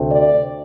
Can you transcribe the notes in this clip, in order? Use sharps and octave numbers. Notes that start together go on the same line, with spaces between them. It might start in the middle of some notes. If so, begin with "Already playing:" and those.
Already playing: D2 C3 A3 C4
D5